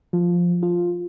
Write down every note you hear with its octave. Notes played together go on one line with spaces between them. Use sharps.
F3
F4